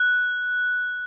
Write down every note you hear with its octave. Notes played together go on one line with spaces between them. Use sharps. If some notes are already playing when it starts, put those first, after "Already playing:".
Already playing: F#6